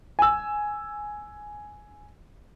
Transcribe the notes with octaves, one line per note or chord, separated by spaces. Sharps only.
G#5 E6